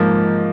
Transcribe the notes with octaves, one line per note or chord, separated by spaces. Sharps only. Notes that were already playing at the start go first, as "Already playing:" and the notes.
Already playing: G#2 F3 A#3